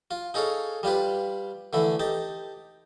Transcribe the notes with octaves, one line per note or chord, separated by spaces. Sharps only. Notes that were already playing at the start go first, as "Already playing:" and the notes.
F4
D#4 G#4 A4 C#5 F5
G3 F4 G4 B4
D3 E3 A3 E4
D#4 G4 A5